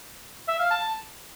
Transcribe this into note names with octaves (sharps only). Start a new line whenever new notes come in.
E5
F5
A5